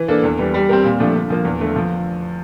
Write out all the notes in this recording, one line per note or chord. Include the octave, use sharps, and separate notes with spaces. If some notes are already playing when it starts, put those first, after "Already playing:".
Already playing: E3
A#3 D4 A4
E2
E3 G3
G3
C4 G4 A#4
A#2
F3 A3 D4
D3
F3 A#3
E2
D3 A3
F3